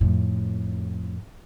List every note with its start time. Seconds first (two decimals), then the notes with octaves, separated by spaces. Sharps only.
0.01 F2 A2